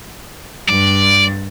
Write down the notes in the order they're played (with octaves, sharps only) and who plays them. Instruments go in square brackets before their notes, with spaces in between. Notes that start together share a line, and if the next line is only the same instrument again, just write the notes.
[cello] G2 [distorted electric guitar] D5